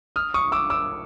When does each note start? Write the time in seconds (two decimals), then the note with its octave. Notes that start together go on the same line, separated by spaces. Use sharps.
0.16 D#6 F6
0.34 C#6 D#6
0.52 D6 E6
0.70 D6 E6